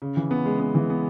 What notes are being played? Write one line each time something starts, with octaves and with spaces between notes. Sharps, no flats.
C#3
E3
B3
G#3
B3
E3
B3